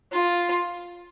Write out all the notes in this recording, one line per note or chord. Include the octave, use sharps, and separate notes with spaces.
F4